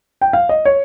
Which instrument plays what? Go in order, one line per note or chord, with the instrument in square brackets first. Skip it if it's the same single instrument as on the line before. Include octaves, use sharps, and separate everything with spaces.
[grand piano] G5
F5
D#5
C#5